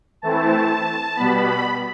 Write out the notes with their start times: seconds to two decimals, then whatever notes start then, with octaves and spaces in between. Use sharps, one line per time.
0.22 E3 A3 C4 E4 A5
1.16 B2 G3 B3 B5